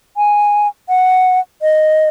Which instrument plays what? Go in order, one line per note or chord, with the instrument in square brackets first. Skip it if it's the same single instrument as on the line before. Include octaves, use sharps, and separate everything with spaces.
[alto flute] G#5
F#5
D#5